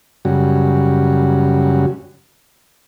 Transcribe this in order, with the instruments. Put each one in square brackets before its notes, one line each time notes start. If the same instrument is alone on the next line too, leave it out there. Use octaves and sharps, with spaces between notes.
[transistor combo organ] F#2 C#3 G3 F#4